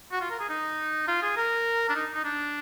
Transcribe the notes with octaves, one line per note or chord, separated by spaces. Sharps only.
F#4
F4
A#4
G#4
D#4
F4
G#4
A#4
D4
D#4
D#4
D4